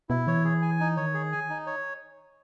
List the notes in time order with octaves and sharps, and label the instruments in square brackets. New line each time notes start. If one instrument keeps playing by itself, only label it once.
[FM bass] B2 [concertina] E4
[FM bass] E3 [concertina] C#5
[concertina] G#4
G#5
D#4
[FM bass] D#3 [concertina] C#5
[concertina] G#4
G#5
D#4
C#5